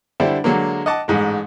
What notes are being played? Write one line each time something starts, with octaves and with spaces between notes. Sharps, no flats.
D3 G3 D4 E4 C5
D3 F#3 G#3 A#3
D#5 F#5 A5 D6
A1 G#2 G#3